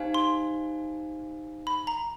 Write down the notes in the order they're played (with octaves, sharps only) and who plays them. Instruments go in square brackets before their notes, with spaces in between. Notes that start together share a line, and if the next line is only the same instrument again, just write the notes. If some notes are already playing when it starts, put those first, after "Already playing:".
Already playing: [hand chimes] D#4 G4 C5 F5 G#5
[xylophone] C6
B5
A#5